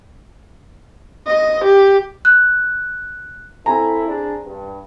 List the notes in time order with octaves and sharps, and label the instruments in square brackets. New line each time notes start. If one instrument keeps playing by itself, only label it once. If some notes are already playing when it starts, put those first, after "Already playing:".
[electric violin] D#5
G4
[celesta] F#6
[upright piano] C4 G#5 A#5 [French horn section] E4 A4
[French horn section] D4 G#4
G2